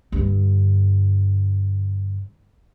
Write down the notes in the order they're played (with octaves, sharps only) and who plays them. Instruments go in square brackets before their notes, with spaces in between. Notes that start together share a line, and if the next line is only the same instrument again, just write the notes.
[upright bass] G2 D3